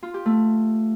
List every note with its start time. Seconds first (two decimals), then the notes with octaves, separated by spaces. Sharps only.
0.03 F4
0.14 G4
0.26 A3